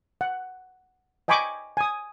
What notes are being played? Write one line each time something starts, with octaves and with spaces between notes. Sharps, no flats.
F#5
D#5 G5 G#5 B5 C#6 D6
G#5 D#6